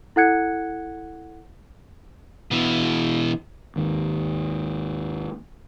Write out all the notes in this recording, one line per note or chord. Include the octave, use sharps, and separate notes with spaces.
E4 A4 F#5 F#6 G#6 C#7
B2 E3
D#2 G#2 D#3